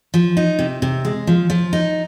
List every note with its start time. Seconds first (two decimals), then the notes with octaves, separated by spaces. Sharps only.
0.14 F3
0.37 D#4
0.59 C3
0.82 C3
1.05 G#3
1.27 F3
1.50 F3
1.73 D#4